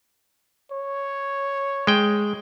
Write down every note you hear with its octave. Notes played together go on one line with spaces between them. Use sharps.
C#5
G#3 G5